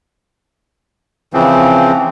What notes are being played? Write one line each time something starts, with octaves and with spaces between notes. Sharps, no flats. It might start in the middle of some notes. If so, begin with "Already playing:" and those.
C#3 E3 F3 C4